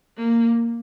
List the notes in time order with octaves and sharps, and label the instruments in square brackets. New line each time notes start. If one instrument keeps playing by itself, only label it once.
[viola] A#3